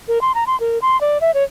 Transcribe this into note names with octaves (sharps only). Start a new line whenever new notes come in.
A#4
C6
A#5
C6
A#4
C6
D5
E5
C#5